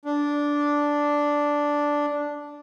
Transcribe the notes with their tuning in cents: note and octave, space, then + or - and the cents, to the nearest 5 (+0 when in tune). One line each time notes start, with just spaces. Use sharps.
D4 -5